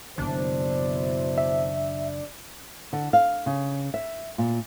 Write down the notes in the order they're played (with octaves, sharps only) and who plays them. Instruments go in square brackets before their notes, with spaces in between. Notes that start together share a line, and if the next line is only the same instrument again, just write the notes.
[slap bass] F#1 B1 D#3 [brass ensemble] B2 E4 C5 [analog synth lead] D4
[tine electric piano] E5
[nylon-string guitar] D3
F5
C#3
E5
A#2